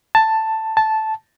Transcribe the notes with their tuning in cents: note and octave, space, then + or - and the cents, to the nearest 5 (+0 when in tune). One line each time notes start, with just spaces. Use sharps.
A5 +5
A5 -10